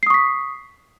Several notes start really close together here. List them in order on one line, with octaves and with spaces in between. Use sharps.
C7 D#6 C#6 B6